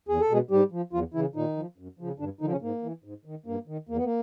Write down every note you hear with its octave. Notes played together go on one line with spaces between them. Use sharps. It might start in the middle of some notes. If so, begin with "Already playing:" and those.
E2 G#4
A4
B2 G#3 G#4
G#2 G3 G4
F3
E2 F3 F4
C#3 E3 E4
A#2 D#3 D#4
F3
F#2
C#3 F3
G2 D3 D4
D3 D#3 F3 D#4
C#3 C#4
G#2 A#3
E3
G#2
D#3
G2 A#3
D#3
E2 A#3
B3
A#3